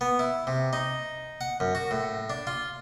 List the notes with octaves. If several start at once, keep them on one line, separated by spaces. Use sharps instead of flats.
B3
E4
C3
D#4
F#5
F#2
F#4
A2
D4
F4